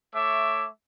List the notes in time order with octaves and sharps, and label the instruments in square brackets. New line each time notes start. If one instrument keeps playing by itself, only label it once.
[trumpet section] A3 C#5 E5 D6